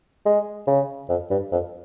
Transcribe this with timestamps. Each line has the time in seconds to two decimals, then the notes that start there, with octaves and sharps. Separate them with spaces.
0.26 G#3
0.67 C#3
1.09 F2
1.30 G2
1.52 F2